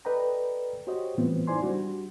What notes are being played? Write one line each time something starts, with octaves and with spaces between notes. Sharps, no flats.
A4 B4 D5 D#5 G5 A#5
F#4 G4 C5 C#5 D#5
A2 E3 G3 B3 C4 F4
D#4 E4 C5 D5 G#5 C6
G3 D4 F#4